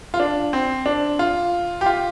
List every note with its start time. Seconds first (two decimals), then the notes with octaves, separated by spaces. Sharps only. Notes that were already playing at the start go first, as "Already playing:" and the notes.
0.14 F4
0.20 D4
0.53 C4
0.86 D4
1.19 F4
1.81 G4
1.86 F4